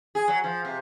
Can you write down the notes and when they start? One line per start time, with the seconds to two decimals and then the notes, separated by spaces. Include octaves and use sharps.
0.15 G#4
0.28 F#3
0.44 F3
0.65 C3